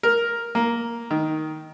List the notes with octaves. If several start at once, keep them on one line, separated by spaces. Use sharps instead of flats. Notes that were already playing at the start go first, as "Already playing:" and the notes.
A#4
A#3
D#3